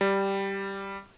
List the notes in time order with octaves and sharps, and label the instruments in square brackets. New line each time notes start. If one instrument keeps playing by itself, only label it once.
[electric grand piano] G3